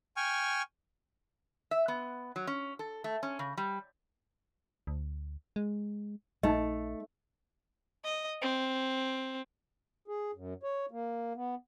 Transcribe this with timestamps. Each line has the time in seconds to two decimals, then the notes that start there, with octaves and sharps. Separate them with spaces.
0.17 G5 G#5 C#6 F6
1.71 E5
1.88 B3
2.36 F#3
2.47 C#4
2.79 A4
3.04 A3
3.23 C#4
3.39 C#3
3.57 G3
4.87 D2
5.56 G#3
6.43 A#1 A3 D#4 D#5
8.04 D#5
8.42 C4
10.08 G#4
10.34 F#2
10.63 C#5
10.91 A#3
11.35 B3